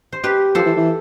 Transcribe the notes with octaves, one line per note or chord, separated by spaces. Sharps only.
C5
G4 B4
F3 A4 C5
E3
E3